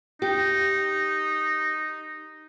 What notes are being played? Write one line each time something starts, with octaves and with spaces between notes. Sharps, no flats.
D#4 G4